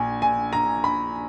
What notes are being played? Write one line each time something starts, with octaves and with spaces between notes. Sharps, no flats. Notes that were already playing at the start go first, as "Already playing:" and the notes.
Already playing: A#1 G#5
G#5
A#5
B5